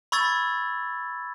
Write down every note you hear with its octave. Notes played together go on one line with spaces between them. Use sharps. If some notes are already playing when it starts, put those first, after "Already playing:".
B5 C#6 E6 G#6 A6